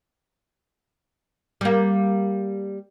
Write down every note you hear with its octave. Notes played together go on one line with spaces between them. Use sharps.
G3 A#3